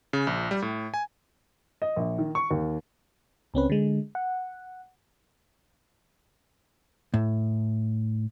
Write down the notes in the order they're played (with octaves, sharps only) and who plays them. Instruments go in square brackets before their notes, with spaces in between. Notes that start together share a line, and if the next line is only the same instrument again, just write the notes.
[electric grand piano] C#3
A#1
G3
A2
G#5
[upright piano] D#5
A#1
D#3
C#6
D#2
[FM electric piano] C#2 C4 C#4 B4
D3 G#3
F#5
[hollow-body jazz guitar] A2